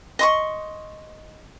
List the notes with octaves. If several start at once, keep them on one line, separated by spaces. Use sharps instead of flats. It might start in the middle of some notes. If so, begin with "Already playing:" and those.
D#5 C6 C#6